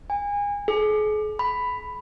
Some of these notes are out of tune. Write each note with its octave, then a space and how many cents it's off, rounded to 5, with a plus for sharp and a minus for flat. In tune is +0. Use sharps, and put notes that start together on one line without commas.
G#5 -30
G#4 +40
B5 +10